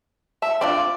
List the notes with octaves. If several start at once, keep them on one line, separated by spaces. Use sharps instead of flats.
E5 A5
C4 D4 F4 D5